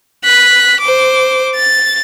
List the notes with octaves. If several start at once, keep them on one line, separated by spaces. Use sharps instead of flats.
F#6 B6
C5 D6
A6